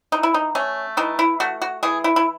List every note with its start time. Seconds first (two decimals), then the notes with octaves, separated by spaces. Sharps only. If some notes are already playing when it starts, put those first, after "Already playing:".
0.12 E3 D#4
0.23 E4
0.34 D#4
0.55 A3 C#4
0.97 E3 D#4
1.19 E4
1.40 A3 F#4
1.62 F#4
1.83 E3 G#4
2.04 E4
2.16 E4